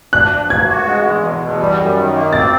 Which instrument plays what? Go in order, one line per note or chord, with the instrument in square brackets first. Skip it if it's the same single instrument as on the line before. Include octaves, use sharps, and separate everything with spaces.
[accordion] D4 [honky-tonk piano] F#6
[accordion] F3
[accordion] A#3 [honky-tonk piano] G#6
[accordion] F#4
G#3
E2
B2
E2
G3
F#2
D#3
A#3
[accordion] C4 [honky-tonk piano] A6